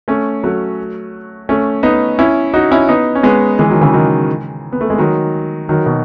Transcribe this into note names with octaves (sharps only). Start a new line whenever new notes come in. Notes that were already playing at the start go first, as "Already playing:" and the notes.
A3 C#4
F#3 A3
A3 C#4
B3 D#4
C#4 E4
D#4 F#4
C#4 E4
B3 D#4
C#4
G#3 B3
E3 G#3
D#3 F#3
C#3 E3
D#3 F#3
B3
A3
G#3
D#3 F#3
D#3 F#3
B2